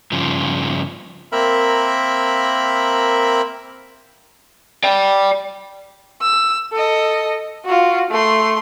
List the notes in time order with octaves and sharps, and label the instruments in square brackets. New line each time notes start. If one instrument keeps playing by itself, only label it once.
[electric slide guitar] G2 C#3 F3
[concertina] A#3 C4 A#4 E5 B5
[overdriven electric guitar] D5 G5
[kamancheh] E6
A4 D#5
F4 F#4
A3 C6